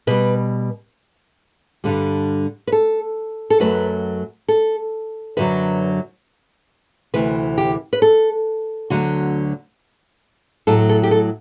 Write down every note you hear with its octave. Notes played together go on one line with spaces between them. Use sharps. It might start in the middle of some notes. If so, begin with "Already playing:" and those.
B2 G3 B4
G2 D3 G3
B4
A4
A4
F#2 F#3 A3 B4
A4
F#2 D3 F#3 B4
D2 C3 E3 B4
G4
B4
A4
D2 D3 F#3 A3 F#4
A2 F#3 A3 A4
A4
G4
A4